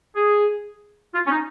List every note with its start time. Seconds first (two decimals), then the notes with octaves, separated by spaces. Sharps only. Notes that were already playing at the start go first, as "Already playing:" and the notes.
0.16 G#4
1.14 F4
1.27 C#4
1.32 D#4